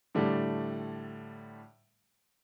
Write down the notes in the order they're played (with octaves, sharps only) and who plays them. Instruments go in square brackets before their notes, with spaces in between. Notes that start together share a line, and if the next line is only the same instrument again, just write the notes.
[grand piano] A2 D3 G3 A3